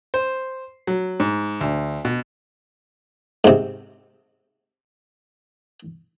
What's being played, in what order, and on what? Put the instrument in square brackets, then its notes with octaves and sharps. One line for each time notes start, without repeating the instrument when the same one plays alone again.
[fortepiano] C5
F#3
G#2
D2
B2
[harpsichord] G#2 C3